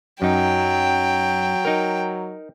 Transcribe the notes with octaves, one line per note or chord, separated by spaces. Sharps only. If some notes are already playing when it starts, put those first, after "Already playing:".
F#2 F#3 D#4 G5
D#4 A#4